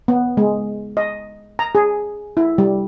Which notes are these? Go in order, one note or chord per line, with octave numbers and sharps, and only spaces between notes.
B3
G#3
D#5
A#5
G#4
E4
G3